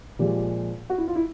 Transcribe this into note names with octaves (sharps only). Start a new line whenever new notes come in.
A#2 F3 G#3 G4
F#4
E4
F4
E4